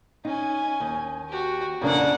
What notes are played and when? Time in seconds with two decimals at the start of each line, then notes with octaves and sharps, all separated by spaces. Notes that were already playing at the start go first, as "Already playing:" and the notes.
0.25 C#4 D#4 G#5
0.80 D#2
1.29 F#4 G4
1.81 F2 C#3 A#3 D4 F#5